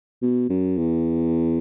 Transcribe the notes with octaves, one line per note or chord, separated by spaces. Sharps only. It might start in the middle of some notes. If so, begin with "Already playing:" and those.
B2
F#2
E2